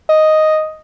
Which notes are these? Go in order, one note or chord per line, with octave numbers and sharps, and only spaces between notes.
D#5